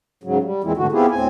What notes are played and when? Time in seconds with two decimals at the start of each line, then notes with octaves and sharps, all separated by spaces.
0.24 G#2 C#3 F#3
0.42 G3
0.64 E2 A#2 E3 G#3 C4 E4
0.77 G#2 B2 D3 A3 F#4
0.92 B3 C4 E4 F4 G4 G#4
1.11 D2 A2 C4 G#5